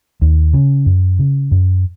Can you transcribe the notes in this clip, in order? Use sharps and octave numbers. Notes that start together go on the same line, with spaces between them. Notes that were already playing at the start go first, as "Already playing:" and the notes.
D#2
C#3
F#2
C#3
F#2